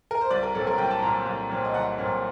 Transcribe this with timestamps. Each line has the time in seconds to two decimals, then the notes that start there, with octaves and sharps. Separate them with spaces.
0.11 A#4
0.21 C5
0.30 C2 D5
0.43 A#4
0.55 A#2 F#3 C4 A4
0.67 A#4
0.78 C2 G5
0.91 A5
1.02 A#2 F#3 C4 A#5
1.26 C2
1.50 A#2 F#3 C4
1.65 D#5
1.74 C2 F#5
1.98 A#2 F#3 C4